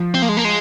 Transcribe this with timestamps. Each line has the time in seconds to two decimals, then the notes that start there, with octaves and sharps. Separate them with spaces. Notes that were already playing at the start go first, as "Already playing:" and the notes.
Already playing: F3
0.14 C4
0.22 A#3
0.29 G#3
0.37 A#3
0.44 G#3